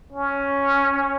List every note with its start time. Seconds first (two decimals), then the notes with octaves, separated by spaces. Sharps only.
0.13 C#4